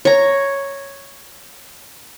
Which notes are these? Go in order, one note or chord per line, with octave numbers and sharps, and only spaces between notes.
C#5 A#5